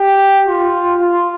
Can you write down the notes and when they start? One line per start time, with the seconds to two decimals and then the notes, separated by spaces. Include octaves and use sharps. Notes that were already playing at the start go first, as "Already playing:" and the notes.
Already playing: G4
0.47 F4
1.00 F4